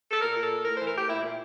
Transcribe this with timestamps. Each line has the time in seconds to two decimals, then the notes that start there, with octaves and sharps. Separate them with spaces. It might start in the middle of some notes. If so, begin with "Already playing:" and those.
0.11 A4
0.21 A#2 A#4
0.35 A#2
0.43 A4
0.50 A#2
0.64 A2 A#4
0.76 E3 C5
0.86 A#4
0.94 A2 G4
1.09 A#2 E4
1.24 A#2